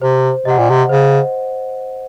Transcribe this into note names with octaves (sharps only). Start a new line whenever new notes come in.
C3 C5
C3 D#5 F#5
A#2
C3
C#3 C5